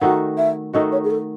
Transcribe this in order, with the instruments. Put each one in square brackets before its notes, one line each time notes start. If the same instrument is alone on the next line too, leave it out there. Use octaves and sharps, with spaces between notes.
[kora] D#3 A3 D#4 F#4 [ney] F#5
[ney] E5
[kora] D#3 A3 D#4 F#4 [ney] D#5
[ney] C#5
G#4
A4